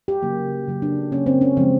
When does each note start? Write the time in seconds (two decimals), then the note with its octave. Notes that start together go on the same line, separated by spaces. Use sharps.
0.08 G4
0.23 C#3 F#3 A#3
0.68 C#3 F#3 A#3
0.82 D4
1.12 C#3 F#3 A#3 C#4
1.26 C4
1.41 C#4
1.57 C#3 F3 G#3 C4